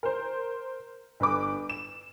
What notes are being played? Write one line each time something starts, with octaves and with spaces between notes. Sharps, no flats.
A#4 C5
G1 B4 D6
E7